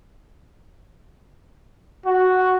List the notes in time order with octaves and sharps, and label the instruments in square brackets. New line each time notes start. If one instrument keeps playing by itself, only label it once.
[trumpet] F#4